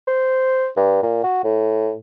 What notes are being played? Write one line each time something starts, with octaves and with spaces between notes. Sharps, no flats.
C5
G2
A#2
F#4
A2